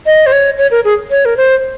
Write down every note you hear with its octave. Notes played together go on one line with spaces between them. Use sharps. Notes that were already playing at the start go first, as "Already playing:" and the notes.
D#5
C5
C#5
C#5
A#4
G#4
C#5
A#4
C5